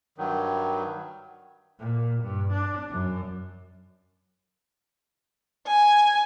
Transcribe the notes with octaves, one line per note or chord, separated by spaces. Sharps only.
G2 D#3 F#3
A#2
G2
D4
F#2
G#5